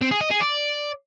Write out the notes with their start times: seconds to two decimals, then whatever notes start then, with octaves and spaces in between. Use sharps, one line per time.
0.02 C4
0.11 G#4
0.21 D#5
0.31 G#4
0.40 D5